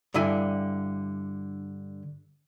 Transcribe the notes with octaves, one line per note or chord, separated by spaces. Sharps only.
G2 D3 E4 G#5